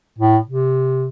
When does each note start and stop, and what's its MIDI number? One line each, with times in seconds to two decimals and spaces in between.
0.19 0.38 45
0.48 1.08 48